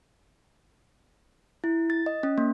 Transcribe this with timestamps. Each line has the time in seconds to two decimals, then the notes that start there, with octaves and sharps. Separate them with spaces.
1.64 E4
1.90 A6
2.06 D#5
2.23 C#4
2.38 A#3